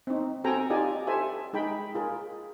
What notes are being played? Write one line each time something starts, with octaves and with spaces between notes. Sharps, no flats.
C4 D#4
C4 F#4 A4 G5 G#5 A#5
D#4 F4 G4 D5 D#5 G#5
G4 A4 C5 E5 G#5
G#3 D#4 G#4 G5 B5
F4 G#4 A#4